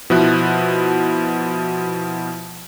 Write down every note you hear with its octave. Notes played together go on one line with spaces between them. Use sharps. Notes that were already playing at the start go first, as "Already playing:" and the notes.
B2 F3 E4 F#6